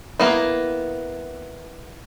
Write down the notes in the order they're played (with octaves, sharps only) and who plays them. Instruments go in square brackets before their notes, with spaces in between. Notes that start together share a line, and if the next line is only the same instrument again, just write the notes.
[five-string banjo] A#3 B3 E4